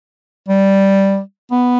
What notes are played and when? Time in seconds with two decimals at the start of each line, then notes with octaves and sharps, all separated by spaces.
0.48 G3
1.51 B3